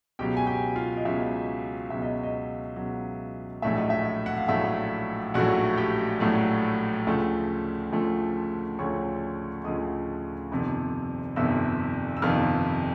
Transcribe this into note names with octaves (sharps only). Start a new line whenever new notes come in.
C#2 B2 F#3 G4 G5
G#5
G4 G5
F4 F5
D#5
C#2 B2 F#3 E5
C#2 B2 F#3 E5
D#5
D#5
C#2 B2 F#3
A#1 A2 F#3 A3 E5
D#5
E5
F#5
F5
A#1 A2 F#3 A3 E5
A#1 A2 F#3 A3 F#4 F#5
G4 G5
A#1 A2 F#3 A3
D2 C#3 F3 A3
D2 C#3 F3 A3
D2 C#3 F3 A3 C#5 C#6
D2 C#3 F3 A3 D#5 D#6
G1 F2 C3 D#3
G1 F2 C3 D#3 E5 E6
E6
G1 F2 C3 D#3 F5 F6